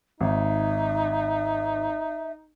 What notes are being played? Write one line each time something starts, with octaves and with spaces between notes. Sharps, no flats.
G#1 D#4 E5